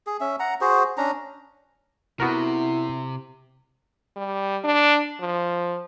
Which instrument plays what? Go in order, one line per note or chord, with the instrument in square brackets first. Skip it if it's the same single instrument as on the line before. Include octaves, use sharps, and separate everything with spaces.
[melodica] G#4
C#4 E5
F#5 A#5
F#4 G#4 C5
C#4 D4 A#5
[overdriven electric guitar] C3 [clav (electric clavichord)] B3 F#4 A#4 [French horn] E4
[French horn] G3
D4
F3